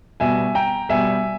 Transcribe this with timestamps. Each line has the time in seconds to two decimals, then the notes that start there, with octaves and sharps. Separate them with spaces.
0.20 B2 G3 E5 G#5
0.55 G5 A#5
0.89 B2 G3 E5 G#5